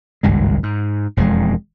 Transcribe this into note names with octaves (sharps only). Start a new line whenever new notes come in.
G#1 C#2 G2 G#3
G#2
E1 F2 F#3 G#3